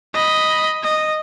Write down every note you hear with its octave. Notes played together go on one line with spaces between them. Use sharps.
D#5 B5
D#5